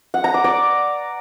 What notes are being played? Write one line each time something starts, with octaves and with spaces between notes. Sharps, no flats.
F#5
A#5
D6
D5